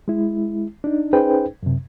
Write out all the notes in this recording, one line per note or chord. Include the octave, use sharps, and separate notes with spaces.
G#3 E4
D4 D#4
C#4 D#4 G#4 B4 C5 G5
F#2 C3